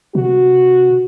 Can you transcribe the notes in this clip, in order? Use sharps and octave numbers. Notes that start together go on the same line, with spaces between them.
C3 F#4